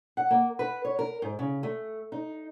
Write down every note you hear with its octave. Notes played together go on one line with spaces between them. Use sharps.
F#5
A#3
B4
C#5
A#4
G#2
C#3
A3
D#4